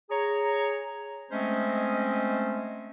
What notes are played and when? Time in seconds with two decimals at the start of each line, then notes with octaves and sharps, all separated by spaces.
0.10 G#4 C#5 A#5
1.31 G#3 A3 C4 C#4 C5 D#5